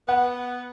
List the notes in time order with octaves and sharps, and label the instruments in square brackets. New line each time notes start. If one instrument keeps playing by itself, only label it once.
[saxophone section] B3 [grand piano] F#5